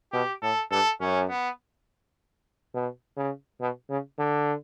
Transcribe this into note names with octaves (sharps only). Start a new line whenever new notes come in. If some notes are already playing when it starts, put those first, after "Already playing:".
B2 G4
A2 A4
G2 A4
F#2 C#4
B3
B2
C#3
B2
C#3
D3